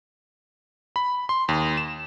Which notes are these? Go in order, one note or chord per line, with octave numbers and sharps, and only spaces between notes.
B5
C6
D#2
E7